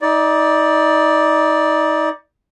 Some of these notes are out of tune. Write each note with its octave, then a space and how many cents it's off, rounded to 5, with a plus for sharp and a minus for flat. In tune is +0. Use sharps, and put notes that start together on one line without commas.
D#4 +30 D5 +0